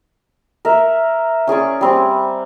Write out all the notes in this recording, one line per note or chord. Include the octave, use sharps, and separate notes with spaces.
A#4 E5
C#4 G#4 D5 C#6
G3 C4 C#6